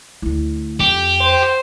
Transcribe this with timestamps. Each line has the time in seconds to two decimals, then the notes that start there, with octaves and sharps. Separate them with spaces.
0.22 D2 E4
0.80 F2 G4
1.20 C5